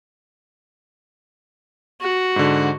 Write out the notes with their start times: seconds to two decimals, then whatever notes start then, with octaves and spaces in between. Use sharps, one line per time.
2.00 F#4
2.36 G#2 D3